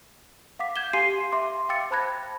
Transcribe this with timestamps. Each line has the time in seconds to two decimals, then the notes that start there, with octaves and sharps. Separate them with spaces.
0.59 F5 F#5 D6 B6
0.76 G6 G#6 E7 G7
0.93 G4 F5 G#5 C6 C7 D#7
1.32 E5 C6 D6
1.69 F5 G5 D6 E6 A6 C#7
1.91 C5 A5 B5 F#6 G#6 A#6